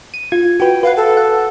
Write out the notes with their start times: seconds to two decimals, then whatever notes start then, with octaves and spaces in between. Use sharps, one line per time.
0.14 D#7
0.32 F4 G#6
0.60 F#4 B4 G5
0.83 B4 F5 F#5
0.97 A4
1.17 F#5